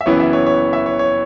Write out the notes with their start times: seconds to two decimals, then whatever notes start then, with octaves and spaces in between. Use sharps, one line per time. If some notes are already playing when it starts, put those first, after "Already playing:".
0.01 E5
0.06 F#1 F#2 E3 B3 E4 C#5
0.20 E5
0.33 C#5
0.46 C#5
0.73 E5
0.86 C#5
0.99 C#5